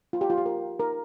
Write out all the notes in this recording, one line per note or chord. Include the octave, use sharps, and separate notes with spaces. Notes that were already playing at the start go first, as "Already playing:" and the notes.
F4
G4
F4
G4
A#4
A#4